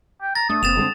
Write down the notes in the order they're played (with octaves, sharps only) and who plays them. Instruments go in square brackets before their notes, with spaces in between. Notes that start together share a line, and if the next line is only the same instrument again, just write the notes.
[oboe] G5
[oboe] A#5 [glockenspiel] A6
[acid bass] A3 [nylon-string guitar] D4 [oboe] D#6
[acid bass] F1 [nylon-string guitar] A#3 C4 [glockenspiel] A6 E7 F7
[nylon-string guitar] D3 G#3 C4